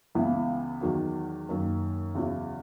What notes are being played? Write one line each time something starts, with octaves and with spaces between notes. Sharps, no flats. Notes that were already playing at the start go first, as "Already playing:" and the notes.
C#2 C#3 E3 B3 E4
E2 D#3 F#3
F#2 D#3 F#3 A#3
E2 C#3 F#3 C#4 E4